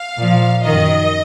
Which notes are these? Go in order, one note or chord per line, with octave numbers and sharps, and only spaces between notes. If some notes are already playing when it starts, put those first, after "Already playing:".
Already playing: F5
A#2 F3
F#2 D#3 D#5